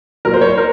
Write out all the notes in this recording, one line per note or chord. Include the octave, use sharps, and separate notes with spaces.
A#2 F#3 A#4
C5
C#5
C5
A#4